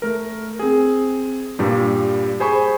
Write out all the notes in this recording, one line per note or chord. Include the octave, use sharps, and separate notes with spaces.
A3 A#4
C4 G#4
G2 A#2 G3
G#4 C5 G#5 B5 C#6